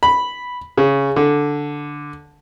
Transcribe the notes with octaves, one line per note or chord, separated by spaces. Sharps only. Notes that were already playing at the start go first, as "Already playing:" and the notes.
B5
C#3
D3